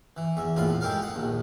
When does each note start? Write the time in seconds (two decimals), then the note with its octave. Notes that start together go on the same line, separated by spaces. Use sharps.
0.16 E3
0.37 E2 E5
0.56 A#1 E2 A2 F4 B5
0.81 G#3 G4 A4 A#4 F5
1.02 F#5 D#6
1.15 A#1 D#2